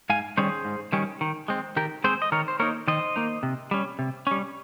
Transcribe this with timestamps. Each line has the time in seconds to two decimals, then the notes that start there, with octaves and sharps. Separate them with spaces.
0.10 G#2 F5 G#5
0.37 D#3 G3 C#4 G#4 C5
0.65 G#2
0.93 D#3 G3 C#4
1.21 D#3
1.48 G#3 C4
1.76 D#3 G4 A#4
2.04 G#3 C4 G#4 C5
2.22 D#5
2.32 D#3 A#4 C#5
2.48 C5
2.60 A#3 D#4 A#4 C#5
2.88 D#3 C5 D#5
3.16 A#3 D#4
3.43 C3
3.71 G3 C#4
3.99 C3
4.27 G3 C#4